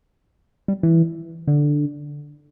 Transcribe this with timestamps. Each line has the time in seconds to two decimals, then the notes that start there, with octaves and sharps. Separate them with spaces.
0.68 G3
0.83 E3
1.48 D3